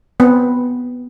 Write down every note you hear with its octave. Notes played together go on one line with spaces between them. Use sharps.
B3 C4